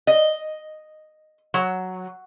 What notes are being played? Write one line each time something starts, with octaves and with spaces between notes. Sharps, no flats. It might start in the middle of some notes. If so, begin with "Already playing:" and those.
D#5
F#3